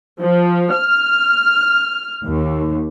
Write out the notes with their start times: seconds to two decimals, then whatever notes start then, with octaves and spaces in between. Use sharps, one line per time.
0.20 F3
0.74 F6
2.24 D#2